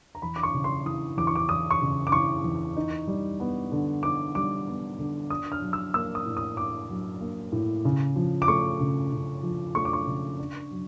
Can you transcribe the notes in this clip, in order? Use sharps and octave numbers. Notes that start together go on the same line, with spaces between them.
A#5
E2 B5
D6
C#6
C#3
C6
E3 D#6
E2 D6
C#6
D6
E2 D#6
C#6
C#3
D6
E3 C#6
E2
D#4
G3
B3
D3
D#4 D6
G3 D6
B3
D3
D4 D#6
F6
F#3
E6
A#3 E6
D#6
A2
D#6
D4 D6
F#3
A#3
A2
C#3
F3
D6
A3 C#6
C#3
C#3
F3
A3 C#6
D6
C#6
C#3
D4
F#3